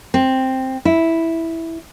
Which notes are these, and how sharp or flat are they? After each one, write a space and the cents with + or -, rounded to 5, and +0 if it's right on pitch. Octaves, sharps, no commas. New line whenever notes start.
C4 +5
E4 -5